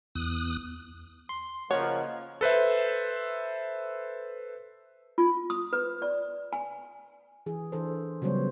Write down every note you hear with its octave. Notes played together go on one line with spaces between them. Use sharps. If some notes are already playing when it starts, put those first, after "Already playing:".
E2 D#6 F#6
C6
C#3 F3 A#3 C#5 D#5 F#5
A4 B4 C5 E5
F4
D#6
B4
D5
G#5
E3 G#4
E3 D4 A4 C5
C#3 F#3 G3 B3 C5 C#5